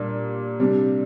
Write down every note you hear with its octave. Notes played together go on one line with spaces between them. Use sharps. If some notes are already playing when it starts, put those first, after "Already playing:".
Already playing: A#2 G3 D4
C3 G3 D4